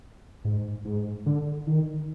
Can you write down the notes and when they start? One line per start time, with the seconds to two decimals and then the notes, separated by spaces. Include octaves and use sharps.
0.45 G#2
0.85 G#2
1.26 D3
1.67 D#3